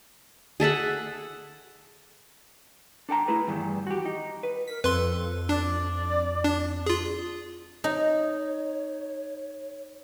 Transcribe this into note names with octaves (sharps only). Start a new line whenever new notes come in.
G#4 A4 E5 F#5
D4 A4 G5 A#5
A3 E4 G#4 B4
E2 G2 D#3
F#4 G4
D#4
B4
A#4 B6
F2 A4 B4 C6
D4 D5
D4
F4 G#4
D#4 C#5